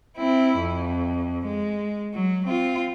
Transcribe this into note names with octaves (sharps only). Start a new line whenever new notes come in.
C4 E4
F2
G#3
F#3
C4 F4